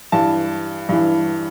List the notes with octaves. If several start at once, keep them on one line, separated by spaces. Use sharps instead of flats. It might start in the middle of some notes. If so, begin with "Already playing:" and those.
G2 E3 A5
G2 E3